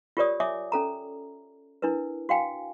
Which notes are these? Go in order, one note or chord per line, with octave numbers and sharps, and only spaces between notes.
F4 G4 A#4 C#5 D5 D#6
C#5 E5 G#5 D6 D#6
C#4 A4 A#5
D4 E4 A#4 B4
F#4 F5 G5 G#5